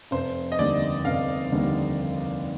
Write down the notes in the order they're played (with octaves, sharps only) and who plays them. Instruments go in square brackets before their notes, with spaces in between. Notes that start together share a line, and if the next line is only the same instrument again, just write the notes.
[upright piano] F1 [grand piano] C5
[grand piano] D#5
[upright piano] D#2 D3 G3 [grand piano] D5
[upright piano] F1 [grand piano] F5
[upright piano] D#2 D3 G3